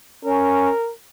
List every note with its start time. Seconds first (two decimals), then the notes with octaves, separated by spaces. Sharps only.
0.25 C#4 A#4